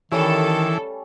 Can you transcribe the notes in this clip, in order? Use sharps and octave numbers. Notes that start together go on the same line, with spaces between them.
D#3 E3 G3 A3 C#4 A4